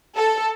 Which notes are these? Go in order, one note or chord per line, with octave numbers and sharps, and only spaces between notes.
A4